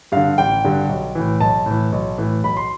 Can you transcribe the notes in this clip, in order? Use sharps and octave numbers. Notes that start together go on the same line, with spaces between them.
G2 D3 F5
A1 G5
G2 D3
B1
A2 E3
B1 A5
A2 E3
B1
A2 E3
B1 B5
C6